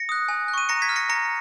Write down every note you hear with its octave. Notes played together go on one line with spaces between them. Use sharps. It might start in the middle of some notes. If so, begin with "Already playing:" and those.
Already playing: A#6 C#7
D#6 F#6
G#5
F#6
C#6 D#7
A#5 A#6 C#7
G#6 B6
F6
A#6 C#7
A#5 A#6 C#7